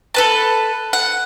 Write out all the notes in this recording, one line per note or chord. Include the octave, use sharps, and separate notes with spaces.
A4 B4 A5
F#5